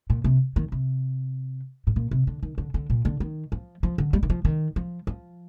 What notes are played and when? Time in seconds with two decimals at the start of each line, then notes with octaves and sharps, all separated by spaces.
0.10 A#2
0.24 C3
0.56 D#3
0.72 C3
1.87 A2
1.96 A#2
2.11 C3
2.27 D3
2.43 D#3
2.58 D3
2.74 D3
2.90 A#2
3.05 D3
3.20 D#3
3.52 F3
3.83 F3
3.98 D3
4.13 G3
4.23 D#3
4.30 F3
4.45 D#3
4.76 F3
5.07 F3